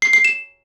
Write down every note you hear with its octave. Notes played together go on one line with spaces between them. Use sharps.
C7
C7
E7